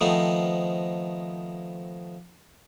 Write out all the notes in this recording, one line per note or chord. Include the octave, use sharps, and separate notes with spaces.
D#3 F3 A3 B3 C4 D#4